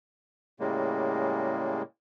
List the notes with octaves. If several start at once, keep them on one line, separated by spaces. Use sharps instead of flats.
A2 C#3 G3 G#3 A#3